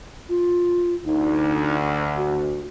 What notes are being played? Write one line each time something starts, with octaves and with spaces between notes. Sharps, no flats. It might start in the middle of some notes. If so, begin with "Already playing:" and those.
F4
D2 D#4
F#4